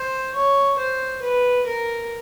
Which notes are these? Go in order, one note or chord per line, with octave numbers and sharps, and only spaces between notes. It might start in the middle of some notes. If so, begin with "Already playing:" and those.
Already playing: C5
C#5
C5
B4
A#4